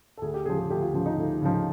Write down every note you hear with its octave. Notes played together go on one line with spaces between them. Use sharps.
A4
D2 G#4
G4
C#3 F3 G#4
G#4
D2 G4
F4
C#3 F3
D#4
D2
C#3 F3